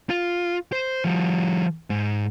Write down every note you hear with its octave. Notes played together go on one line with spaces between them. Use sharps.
F4
C5
F3 G3
G#2